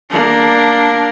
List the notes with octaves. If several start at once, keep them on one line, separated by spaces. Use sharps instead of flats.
A#3 D4